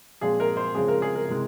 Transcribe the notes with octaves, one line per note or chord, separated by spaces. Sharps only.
A#2 F3 G#3 C4 G#4
A#4
C5
C#3 F3 G#3 C4 G#4
A#4
G#4
A#4
C3 E3 G#3 C4